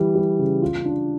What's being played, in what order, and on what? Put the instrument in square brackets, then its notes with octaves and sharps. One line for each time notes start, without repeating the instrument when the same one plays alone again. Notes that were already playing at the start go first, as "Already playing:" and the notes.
Already playing: [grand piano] E3 G3
G3
C#3
F4
D4